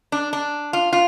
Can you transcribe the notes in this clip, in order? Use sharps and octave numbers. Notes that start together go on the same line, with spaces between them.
D4
D4
F4
F4